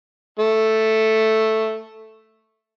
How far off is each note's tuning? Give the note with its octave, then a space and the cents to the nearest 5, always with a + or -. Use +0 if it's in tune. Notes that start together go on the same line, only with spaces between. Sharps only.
A3 +0